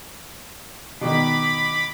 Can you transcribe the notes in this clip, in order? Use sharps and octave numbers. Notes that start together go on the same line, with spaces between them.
B2 D#3 B5 D6